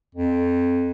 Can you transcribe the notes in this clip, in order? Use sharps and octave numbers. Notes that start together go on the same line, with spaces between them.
F2